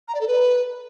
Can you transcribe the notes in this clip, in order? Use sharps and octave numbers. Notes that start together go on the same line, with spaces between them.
A#5
D5
A4
B4